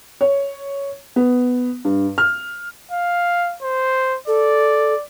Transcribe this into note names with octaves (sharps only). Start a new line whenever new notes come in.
C#5
B3
G2
F6
F5
C5
A4 D5